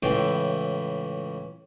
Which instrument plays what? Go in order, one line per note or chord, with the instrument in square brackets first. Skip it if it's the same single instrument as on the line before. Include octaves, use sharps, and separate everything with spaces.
[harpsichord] C#2 A2 E3 G5